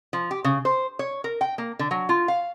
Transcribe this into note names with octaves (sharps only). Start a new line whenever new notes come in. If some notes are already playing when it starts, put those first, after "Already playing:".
F3
G4
C#3
C5
C#5
A#4
G5
A#3
D3
F#3
F4
F5